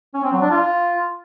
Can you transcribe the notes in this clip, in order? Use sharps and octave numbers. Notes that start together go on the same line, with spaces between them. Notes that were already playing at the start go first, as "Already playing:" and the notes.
C#4
C4
F#3
D4
F4